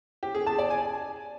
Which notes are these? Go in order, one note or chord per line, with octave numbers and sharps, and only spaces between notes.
G4
G#4
A5
D5
G#5